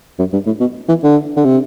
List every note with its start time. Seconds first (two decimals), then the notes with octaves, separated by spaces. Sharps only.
0.19 F#2
0.33 G2
0.46 A2
0.60 B2
0.88 E3
1.04 D3
1.36 D3
1.45 C3